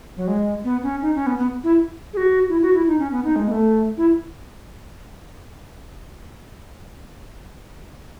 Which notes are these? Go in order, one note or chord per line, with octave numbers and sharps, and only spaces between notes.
F#3
G#3
B3
C#4
D#4
C#4
B3
B3
E4
G#4
F#4
E4
F#4
E4
D#4
C#4
B3
D#4
G#3
B3
A3
E4